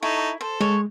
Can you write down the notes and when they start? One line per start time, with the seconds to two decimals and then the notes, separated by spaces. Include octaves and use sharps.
0.03 D#4 E4 A4 C#6
0.41 A4 C5
0.61 G#3 C#5